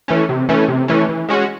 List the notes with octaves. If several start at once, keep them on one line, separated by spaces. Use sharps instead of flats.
E3 A3 C#4
C3
E3 A3 C#4
C3
E3 A3 C#4
E3
G#3 C#4 F#4